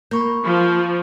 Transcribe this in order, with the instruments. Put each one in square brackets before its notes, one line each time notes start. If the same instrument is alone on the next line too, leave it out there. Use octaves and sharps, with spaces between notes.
[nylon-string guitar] A#3 [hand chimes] B5 C#6 G6
[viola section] F3